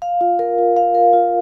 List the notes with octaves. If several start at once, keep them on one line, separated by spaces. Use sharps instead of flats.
F5
F4
A#4
F4
F5
A#4
F4